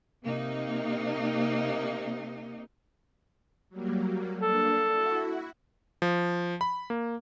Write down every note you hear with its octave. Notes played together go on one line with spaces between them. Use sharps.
C3 A#3 D#4
F#3 G3 A#3
A#3 D4 A4
E4 F#4
F3
B5
A#3